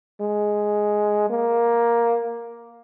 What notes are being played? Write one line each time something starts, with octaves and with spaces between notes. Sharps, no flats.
G#3
A#3